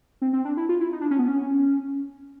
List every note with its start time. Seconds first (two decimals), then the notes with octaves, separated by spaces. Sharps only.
0.22 C4
0.33 C4
0.45 D4
0.57 E4
0.69 F4
0.80 E4
0.93 D#4
1.01 D4
1.11 C#4
1.19 B3
1.28 C#4